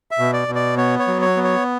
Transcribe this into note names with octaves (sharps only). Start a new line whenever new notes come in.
E5
B2
D5
B2
D5
B3 C#5
C#5
F#3
C#5
B3
C#5